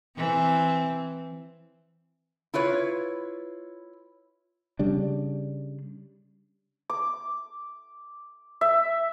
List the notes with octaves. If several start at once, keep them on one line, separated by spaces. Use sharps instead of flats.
E3 C4
E4 F4 B4 C#5
C#3 G3 D4
D6
E5